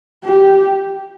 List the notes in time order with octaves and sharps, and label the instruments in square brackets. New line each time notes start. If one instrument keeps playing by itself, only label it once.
[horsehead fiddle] G4